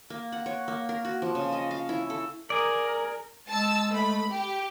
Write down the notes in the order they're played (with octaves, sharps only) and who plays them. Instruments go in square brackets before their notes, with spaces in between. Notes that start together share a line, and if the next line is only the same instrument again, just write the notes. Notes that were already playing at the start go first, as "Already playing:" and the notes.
[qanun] A#3
F#5
C#5
A#3
A#4
F#4
F3
C#3
D#5
F5
E4
A4
[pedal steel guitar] G#4 D5 [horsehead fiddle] A#4
[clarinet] G#3 [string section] A5 E6
[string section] A3 B5
G4